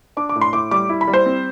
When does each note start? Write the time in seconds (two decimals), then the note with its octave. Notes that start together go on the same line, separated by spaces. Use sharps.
0.17 D4 D6
0.29 D6
0.36 A2
0.41 C6
0.53 A2 D6
0.71 G3 D6
0.89 E4
1.01 B5
1.08 G3
1.14 C5
1.26 C4